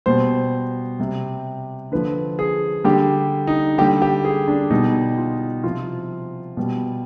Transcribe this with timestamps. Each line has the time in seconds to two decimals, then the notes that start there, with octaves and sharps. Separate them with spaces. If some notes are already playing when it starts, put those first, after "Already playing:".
0.06 B2 G3 C5
1.00 C3 G3
1.92 D3 F3 B4
2.39 G#4
2.84 D3 G3 G4
3.47 D#4
3.78 D3 G3 G4
4.02 G4
4.24 G#4
4.48 D4
4.70 B2 G3 D#4
5.18 F4
5.63 C3 F3 F4
6.57 B2 G3